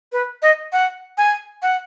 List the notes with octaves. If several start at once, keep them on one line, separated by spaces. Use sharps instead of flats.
B4
D#5
F#5
G#5
F#5